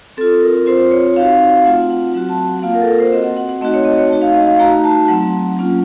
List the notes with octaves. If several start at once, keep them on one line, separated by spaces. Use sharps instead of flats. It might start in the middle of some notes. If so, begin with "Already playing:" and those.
C4 F4 A4
A#4
C4 F4 C5
C#5
C4 D#4 F#4 F5
A3 C4 F4 F#5
F#5
F#3 C4 F#4 F#5
A5
F#5
F#5
A#3 F4 F5
A#4
A4
A#4
C5
C4 F#4 D#5
F#5
F#5
F#5
A3 C4 D#4 F#4 D#5
C#5
D#5
C#5
A3 D#4 F#4
F5
D#5
F5
A3 D#4 F#4 A#5
A5
F#3 A3 C4 F#5
F#3 A#3 C#4 F4